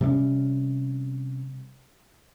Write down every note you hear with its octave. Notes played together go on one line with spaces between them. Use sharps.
C3 G3 A3 C#4